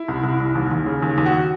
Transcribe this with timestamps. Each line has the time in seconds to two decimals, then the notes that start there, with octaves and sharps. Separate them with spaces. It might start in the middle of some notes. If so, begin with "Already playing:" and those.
Already playing: E4
0.08 C2
0.23 C2
0.40 C2
0.55 D#2
0.71 D#2
0.86 C#3
1.03 D#2
1.18 D#2
1.26 F#4